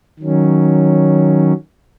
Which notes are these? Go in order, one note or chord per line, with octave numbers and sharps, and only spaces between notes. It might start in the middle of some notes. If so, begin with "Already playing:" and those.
D#3 F#3 C#4